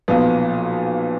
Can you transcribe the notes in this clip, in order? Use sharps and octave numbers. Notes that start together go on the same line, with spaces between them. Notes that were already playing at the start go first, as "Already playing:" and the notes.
B1 A#2 F3 B3